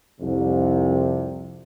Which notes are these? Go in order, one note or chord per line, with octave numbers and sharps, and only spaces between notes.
C2 F2 C3